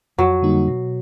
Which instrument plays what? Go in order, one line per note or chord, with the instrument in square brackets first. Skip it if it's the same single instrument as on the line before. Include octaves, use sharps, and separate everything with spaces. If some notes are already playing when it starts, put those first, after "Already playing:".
[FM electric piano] F2 [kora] F#3
[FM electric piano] D3 G3 A#3 D#4
B2